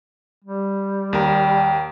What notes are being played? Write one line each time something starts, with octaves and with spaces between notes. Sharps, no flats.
G3
D#2 A#4 G5